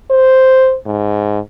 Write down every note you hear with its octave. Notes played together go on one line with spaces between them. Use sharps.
C5
G#2